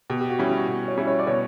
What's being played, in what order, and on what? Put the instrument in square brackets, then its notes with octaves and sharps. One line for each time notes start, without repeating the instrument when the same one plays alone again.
[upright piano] B2 [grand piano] G4
[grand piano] G4
F#4
[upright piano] G3 C#4 E4
[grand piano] F#4
[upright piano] B2
[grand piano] C#5
[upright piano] G3 C#4 E4
[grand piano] C#5
D5
[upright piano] B2 [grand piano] C#5